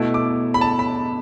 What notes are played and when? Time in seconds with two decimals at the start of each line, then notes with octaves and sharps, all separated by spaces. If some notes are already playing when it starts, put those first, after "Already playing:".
Already playing: B2 A3 E4
0.14 D6
0.54 B5
0.61 A5
0.79 B5